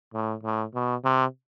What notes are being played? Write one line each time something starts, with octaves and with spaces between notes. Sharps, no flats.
A2
A2
B2
C3